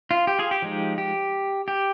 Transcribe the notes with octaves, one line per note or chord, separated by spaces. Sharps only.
F4
G4
F4 G#4
G4
F3 G#3 D#4
G4
G4